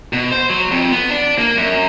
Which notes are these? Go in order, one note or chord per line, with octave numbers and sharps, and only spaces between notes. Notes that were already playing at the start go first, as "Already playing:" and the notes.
B2
C5
F#3
F2
B3
D4
A#3
F#2